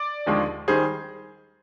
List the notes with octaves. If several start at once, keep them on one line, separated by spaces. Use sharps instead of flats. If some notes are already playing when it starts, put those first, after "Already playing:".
Already playing: D5
D#2 D3 F3 G#3
D#3 G3 G#4 C5